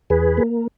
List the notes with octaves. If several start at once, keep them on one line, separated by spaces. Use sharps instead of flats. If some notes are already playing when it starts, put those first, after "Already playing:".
E2 G#4 B4
A#3